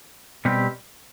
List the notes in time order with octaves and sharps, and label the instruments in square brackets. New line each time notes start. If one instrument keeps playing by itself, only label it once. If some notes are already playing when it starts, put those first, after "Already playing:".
[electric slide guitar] B2 G3 C4 G4